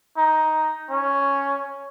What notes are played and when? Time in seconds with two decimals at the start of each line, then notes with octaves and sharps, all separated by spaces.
0.17 D#4
0.90 C#4